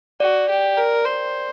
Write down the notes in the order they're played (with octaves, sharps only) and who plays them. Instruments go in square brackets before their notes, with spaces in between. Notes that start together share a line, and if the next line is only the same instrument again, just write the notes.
[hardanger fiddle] F#4 [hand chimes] D5
[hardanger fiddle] G4
A#4
C5